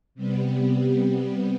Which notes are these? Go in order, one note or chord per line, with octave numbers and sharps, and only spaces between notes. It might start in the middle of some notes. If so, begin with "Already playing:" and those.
C3 G3 B3